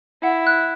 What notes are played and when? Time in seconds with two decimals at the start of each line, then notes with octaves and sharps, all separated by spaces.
0.23 E4 F#5
0.47 F#6